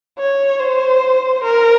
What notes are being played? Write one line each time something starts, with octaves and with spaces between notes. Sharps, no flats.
C#5
C5
A#4